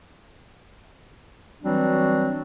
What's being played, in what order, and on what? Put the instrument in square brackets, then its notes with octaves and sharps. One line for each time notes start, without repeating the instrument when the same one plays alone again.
[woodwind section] E3 F#3 G3 C4 D4 F#4